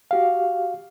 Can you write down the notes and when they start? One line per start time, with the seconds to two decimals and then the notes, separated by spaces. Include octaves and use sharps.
0.11 F#4 G4 F5